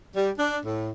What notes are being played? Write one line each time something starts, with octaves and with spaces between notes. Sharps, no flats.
G3
D4
A2